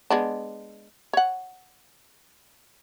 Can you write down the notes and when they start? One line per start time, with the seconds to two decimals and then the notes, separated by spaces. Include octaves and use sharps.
0.10 G#3 B3 D4
1.13 C#5 F#5